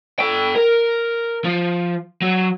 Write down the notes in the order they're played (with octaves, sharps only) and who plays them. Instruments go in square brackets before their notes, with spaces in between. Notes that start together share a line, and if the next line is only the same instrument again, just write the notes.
[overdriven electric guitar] A4 G5
A#4
F3
F#3